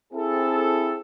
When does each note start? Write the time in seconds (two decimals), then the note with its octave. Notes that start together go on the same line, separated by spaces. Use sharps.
0.13 C4 E4 G#4 A4